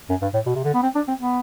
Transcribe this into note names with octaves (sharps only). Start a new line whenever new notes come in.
F#2
G2
A2
B2
C3
D3
B3
C4
D4
C4
B3